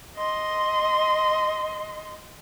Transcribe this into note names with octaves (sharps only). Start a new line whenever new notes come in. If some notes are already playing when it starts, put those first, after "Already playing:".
D#5 C6